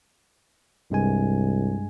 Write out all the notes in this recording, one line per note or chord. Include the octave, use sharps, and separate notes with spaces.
C2 G2 G#3 G#5